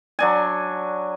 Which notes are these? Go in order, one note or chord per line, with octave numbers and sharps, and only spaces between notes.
F#3 D4 G#5